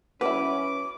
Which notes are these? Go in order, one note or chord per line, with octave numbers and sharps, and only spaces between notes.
F#3 C#4 E4 B4 D6